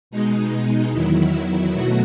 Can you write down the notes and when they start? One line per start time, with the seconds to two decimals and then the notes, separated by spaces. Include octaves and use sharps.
0.11 B2 G#3 D#4
0.92 E2 D#3 F#3 E4
1.73 B2 F#3 A3 F#4